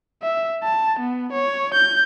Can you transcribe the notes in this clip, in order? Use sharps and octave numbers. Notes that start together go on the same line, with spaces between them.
E5
A5
B3
C#5
G6